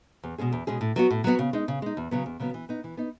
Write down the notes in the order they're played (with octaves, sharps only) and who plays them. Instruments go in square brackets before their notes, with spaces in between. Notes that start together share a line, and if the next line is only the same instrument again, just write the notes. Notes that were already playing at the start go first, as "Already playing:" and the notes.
[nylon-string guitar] E2
B2 G#3 C#4 G#4
E2
B2 G#3 C#4 G#4
A2
F#3 B3 F#4
A2
F#3 B3 F#4
C#3
G#3 D#4
C#3
G#3 D#4
E2
C#3 F#3 B3
E2
C#3 F#3 B3
E3
B3 D#4
E3
B3 D#4